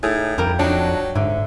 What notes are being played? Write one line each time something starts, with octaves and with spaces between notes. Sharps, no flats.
A2 D#4 G#4
F2 G3 A#4 G5
F#3 D4 D#4
G#2 D3 E5